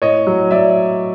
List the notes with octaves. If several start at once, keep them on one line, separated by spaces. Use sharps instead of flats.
A2 C#5 D#5
F#3
F#3 D5 E5